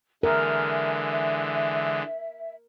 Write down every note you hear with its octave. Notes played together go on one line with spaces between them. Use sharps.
D3 E3 G#3 A#4 E5